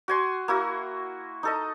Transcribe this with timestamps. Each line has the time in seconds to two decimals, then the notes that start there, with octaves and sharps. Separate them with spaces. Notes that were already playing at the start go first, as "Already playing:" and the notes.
0.08 F#4 G#5 C6
0.48 A#3 E4 F#4
1.43 D#4 A4 D#5